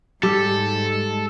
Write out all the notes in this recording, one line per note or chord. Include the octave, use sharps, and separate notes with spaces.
G#2 G3 G4 A4